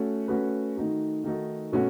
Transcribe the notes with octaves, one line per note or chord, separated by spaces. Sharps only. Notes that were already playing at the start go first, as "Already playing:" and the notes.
Already playing: A3 C#4 F#4
A3 C#4 F#4 B4
D#3 A3 D#4 F#4 A4
D#3 A3 D#4 F#4 A4
B2 A3 C#4 F#4